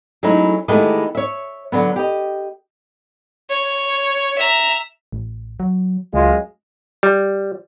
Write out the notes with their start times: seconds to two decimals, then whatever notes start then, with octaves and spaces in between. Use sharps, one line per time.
0.23 F#3 G#3 A3 C#4 D#4 E4
0.68 D#3 E3 G#3 A3 B3 G4
1.15 C#5 E5
1.72 D3 F#3 B3
1.96 G4 D#5
3.50 C#5
4.38 E5 A#5
5.12 A1
5.60 F#3
6.14 C#2 F#2 G#3 F4
7.03 G3